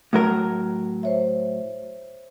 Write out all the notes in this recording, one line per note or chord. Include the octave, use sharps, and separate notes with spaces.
A2 F#3 A#4
C5 C#5 E5